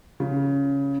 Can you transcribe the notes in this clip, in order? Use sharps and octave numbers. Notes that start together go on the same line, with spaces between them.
C#3